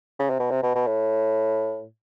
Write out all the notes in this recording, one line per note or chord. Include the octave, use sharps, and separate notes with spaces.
C#3
C3
B2
C3
B2
B2
A2